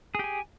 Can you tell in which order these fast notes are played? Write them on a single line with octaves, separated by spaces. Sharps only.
G#4 G4 G#5